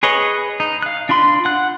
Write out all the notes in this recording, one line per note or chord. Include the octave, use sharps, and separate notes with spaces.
G#4 B4 C#5 D#5
D#4
F5 F#6
D4 F4 B5 C6
F#5 F#6